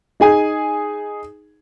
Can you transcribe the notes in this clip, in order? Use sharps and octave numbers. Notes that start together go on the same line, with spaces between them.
D#4 G#4 G#5